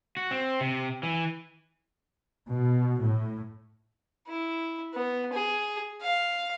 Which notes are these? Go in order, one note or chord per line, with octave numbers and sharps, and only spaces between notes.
F#4
C4
C3
E3
B2
A2
E4
B3
G#4
F5